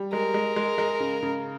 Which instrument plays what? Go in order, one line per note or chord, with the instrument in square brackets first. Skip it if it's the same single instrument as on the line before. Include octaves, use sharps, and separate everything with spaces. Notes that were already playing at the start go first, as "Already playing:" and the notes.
Already playing: [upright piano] G3
[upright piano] G#3 [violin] A#4
[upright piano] G#3
G#3
G#3
C#3
C#3